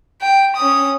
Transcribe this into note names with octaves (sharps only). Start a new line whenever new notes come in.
G5
C#4 D#6